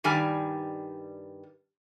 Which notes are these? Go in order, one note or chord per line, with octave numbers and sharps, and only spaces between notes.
G2 D#3 G3 G#5